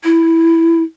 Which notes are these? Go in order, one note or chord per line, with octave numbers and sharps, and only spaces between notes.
E4